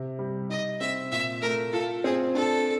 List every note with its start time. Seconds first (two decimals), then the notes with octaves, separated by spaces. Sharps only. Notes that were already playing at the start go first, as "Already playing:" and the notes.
Already playing: C3
0.19 G3
0.49 D#4 D#5
0.80 C4 E5
1.12 A#2 E5
1.42 A3 A#4
1.73 F4 A4
2.04 C4 G#4
2.35 D4 A4